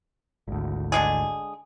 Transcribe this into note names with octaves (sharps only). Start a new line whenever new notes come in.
G#1 D2
D3 G#3 G#4